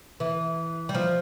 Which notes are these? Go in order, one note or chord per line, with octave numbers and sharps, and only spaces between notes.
E3
G3
F3